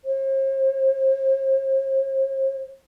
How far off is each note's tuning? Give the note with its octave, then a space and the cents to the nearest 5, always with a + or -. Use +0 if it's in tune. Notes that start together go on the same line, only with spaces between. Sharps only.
C5 +45